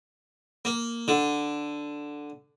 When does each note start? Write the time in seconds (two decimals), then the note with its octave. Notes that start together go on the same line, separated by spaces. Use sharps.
0.65 A#3
1.08 D3